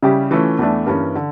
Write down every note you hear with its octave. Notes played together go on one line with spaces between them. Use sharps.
C#3 G3 C#4 E4 G4
E3 A3 C#4 F4
E2 E3 A3 D4
G2 E3 A#3 C#4
D3